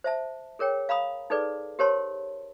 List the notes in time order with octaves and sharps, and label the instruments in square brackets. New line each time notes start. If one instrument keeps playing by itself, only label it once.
[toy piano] C5 E5 A5
G#4 A#4 C#5 G5
F5 A#5 B5 D#6
D#4 G#4 A4 B4 D5
G4 A#4 C5 C#5 A5 C6